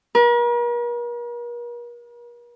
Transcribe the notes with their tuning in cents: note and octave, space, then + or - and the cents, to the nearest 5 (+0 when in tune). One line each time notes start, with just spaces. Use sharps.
A#4 +45